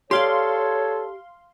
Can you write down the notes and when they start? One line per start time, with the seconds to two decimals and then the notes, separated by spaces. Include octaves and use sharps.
0.11 G4 A4 C#5 D5 F5 C6